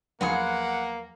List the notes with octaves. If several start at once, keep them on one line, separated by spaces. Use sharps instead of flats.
E2 F3 F#3 A#3 B3 F4 G#4 F#5